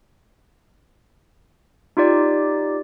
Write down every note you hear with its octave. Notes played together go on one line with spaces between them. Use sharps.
D#4 F4 G4 D5